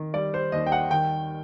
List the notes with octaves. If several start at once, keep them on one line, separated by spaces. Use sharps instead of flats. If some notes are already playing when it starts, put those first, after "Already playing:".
Already playing: D#3
G3 D5
C5
D#2 D#5
G5
F#5
D#3 G5